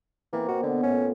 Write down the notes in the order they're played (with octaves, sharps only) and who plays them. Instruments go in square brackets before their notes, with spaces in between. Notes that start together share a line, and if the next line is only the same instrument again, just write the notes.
[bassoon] E3 [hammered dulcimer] A#3 C4
[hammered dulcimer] B2 [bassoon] F#4
[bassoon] D3 [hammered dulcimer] B3
[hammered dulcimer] A2 F4 [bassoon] C#4